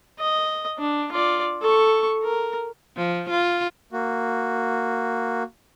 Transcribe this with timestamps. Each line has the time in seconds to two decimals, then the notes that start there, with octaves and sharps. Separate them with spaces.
0.19 D#5
0.79 D4
1.12 F4 D5
1.62 A4 C#6
2.23 A#4
2.97 F3
3.30 F4
3.92 A#3 F#4